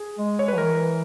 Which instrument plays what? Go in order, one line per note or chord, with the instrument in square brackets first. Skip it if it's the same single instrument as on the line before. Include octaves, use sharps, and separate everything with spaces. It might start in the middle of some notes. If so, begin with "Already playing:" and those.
Already playing: [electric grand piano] G#4
[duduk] G#3
[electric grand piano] C#5
B4
[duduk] E3 [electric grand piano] A#4